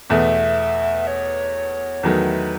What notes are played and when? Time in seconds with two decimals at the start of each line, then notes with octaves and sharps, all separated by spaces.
0.10 E2 B2 A3 E5
1.07 C#5
2.03 E2 D#3 F#3 A3 B4